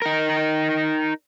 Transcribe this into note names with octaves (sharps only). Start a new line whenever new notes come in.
D#4 A#4